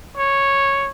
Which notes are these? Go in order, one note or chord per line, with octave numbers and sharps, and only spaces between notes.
C#5